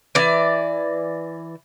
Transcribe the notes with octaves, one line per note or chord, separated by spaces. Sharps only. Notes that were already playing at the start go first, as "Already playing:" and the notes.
E3 D5